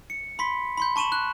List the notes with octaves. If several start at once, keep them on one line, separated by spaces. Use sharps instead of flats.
C#7
B5 C6 B6
B5 C6 G6
A5 C#6 D#7 E7 F#7
F#6